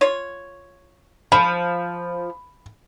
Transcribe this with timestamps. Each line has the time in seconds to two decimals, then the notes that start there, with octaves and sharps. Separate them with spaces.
0.01 F4 C#5
1.32 F3 B5